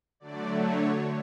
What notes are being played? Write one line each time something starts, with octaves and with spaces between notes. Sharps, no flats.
D3 F#3 A3 D5
C#5